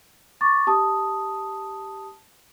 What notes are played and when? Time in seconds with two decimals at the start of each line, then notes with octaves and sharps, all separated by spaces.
0.41 C#6 D6 A6
0.67 G4 A5 D#6